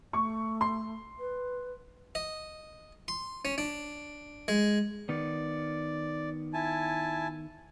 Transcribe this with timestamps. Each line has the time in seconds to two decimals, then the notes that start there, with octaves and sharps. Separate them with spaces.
0.13 A3 C#6
0.61 C6
1.19 B4
2.15 D#5
3.08 C6
3.45 C#4
3.58 D4
4.48 G#3
5.09 D#3 B3 D5
6.54 E4 G#5 A5